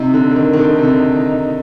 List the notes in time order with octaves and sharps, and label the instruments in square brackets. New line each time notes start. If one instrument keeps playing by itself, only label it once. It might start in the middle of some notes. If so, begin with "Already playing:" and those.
Already playing: [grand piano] C3 [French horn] D#4
[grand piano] D3
D3
D#3
D#3
D3
C3
D3